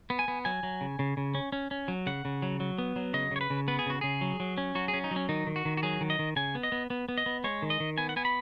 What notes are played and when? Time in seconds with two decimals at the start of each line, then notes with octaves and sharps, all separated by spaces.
0.10 B3
0.19 G#5
0.28 B3
0.45 F#3 G#5
0.63 F#3
0.81 C#3
0.99 C#3
1.17 C#3
1.35 C#4
1.52 C#4
1.71 C#4
1.88 F#3
2.07 C#3 F#5
2.25 C#3
2.42 F#3
2.60 F#3
2.78 B3
2.96 F#3
3.14 C#3 D#5
3.31 C#3 C#5
3.41 B4
3.50 C#3
3.68 B3 B4
3.79 G#4
3.86 C#3 F#4
4.01 C#3 G#4
4.21 F#3
4.40 F#3
4.58 C#4
4.75 F#3 F#4
4.88 G#4
4.94 C#4
5.04 D#4
5.11 F#3 C#4
5.29 D#3 D#4
5.47 D#3
5.56 F#4
5.65 D#3
5.77 F#4
5.83 F#3 G#4
6.01 D#3
6.10 D#5
6.19 D#3
6.36 C#3 G#5
6.55 B3
6.63 D#5
6.72 B3
6.90 B3
7.09 B3
7.18 D#5
7.26 B3
7.44 G#3 C#5
7.62 D#3
7.70 D#5
7.80 D#3
7.98 B3 G#5
8.09 F#5
8.16 B3 G#5
8.25 B5